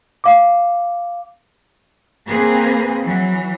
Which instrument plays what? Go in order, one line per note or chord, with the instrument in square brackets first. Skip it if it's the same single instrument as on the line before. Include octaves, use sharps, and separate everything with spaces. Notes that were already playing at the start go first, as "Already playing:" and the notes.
[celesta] F5 D6
[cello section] A#3 C4 G#4 B4
E3 F#3